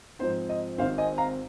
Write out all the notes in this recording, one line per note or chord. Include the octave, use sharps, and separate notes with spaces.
G#2 F3 C4 D#4 C5
D#5
G#1 G#2 D#3 C4 C5 F5
D#5 G#5
F5 A#5